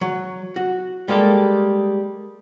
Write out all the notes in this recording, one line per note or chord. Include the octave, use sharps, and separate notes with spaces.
F#3
F#4
G3 G#3 A#3 G4 A4